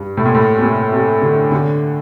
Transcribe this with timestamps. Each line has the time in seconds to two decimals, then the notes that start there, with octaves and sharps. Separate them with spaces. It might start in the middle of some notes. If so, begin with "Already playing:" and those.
Already playing: G2
0.17 A2
0.25 A#2
0.35 A2
0.57 C3
0.61 A#2
0.92 C3
1.22 D3
1.52 D3